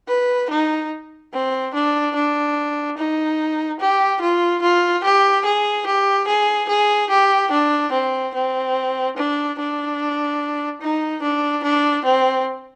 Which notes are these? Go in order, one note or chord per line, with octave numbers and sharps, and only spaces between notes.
B4
D#4
C4
D4
D4
D#4
G4
F4
F4
G4
G#4
G4
G#4
G#4
G4
D4
C4
C4
D4
D4
D#4
D4
D4
C4